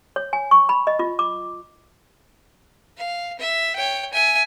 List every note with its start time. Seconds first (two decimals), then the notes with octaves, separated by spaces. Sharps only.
0.16 C#5
0.33 G#5
0.51 C#6
0.69 B5
0.87 D#5
0.99 F4
1.19 D6
2.98 F5
3.39 E5
3.76 C#5 G5
4.13 E5 G#5